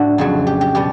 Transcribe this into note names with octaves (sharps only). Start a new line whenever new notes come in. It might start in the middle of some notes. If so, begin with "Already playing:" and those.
Already playing: A2 D4 F#4
F2 C#3 F#3
G4
G4
B2 G3 G4